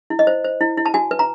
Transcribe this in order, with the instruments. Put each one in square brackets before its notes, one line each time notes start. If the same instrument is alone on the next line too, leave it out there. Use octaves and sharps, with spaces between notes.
[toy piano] E4
D#5
C5
C5
E4
E4
A5
F#4 G#5
B4
A#5